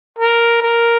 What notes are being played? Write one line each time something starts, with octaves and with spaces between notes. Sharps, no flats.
A#4
A#4